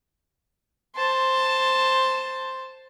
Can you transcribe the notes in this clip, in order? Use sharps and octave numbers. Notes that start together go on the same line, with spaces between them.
C5 A5